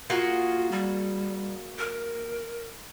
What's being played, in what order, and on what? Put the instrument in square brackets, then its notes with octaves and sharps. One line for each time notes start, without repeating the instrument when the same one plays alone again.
[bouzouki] A#3 F#4 G#4 [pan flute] F4
[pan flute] G3
A#4